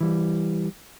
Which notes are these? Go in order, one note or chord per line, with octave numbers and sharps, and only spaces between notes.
E3 G3